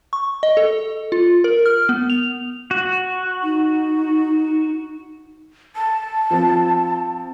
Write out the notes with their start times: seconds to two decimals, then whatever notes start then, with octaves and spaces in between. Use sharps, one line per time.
0.13 C#6
0.43 D#5
0.57 A4
1.12 F4
1.44 A#4
1.66 F6
1.89 B3
2.10 F7
2.71 F#4
3.43 D#4
5.76 A5
6.30 F3 C4